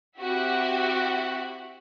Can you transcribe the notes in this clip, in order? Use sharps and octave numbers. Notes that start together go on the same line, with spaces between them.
C4 E4 F#4 G4 E5 F#5